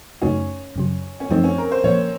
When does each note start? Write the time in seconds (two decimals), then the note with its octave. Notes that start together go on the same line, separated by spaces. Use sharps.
0.22 F#2 C#3 A3 C#4 D#4 F#4
0.76 F#2 C#3 F#3
1.20 C#4
1.30 F#2 F3 A3 C4 D#4
1.44 C#4
1.58 A#4
1.72 C5
1.84 A#2 F3 A#3 C#5